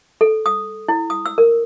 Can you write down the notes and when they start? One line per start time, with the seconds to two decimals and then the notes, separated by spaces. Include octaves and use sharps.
0.21 A4
0.46 D#6
0.89 E4
1.10 D#6
1.26 E6
1.38 A#4